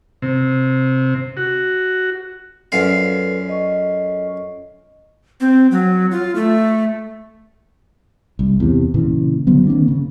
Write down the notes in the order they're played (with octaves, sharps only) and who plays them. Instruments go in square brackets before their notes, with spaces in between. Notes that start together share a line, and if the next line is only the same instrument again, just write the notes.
[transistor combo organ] C3
F#4
[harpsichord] F#2 F4 [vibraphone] A4 B4 D5
[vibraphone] A4 D#5 C#6
[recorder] C4
F#3
F4
A3
[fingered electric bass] C2
E2 C3
A#2 C#3 E3
D3 F#3 B3
D#3 A#3 C4 D4
C#3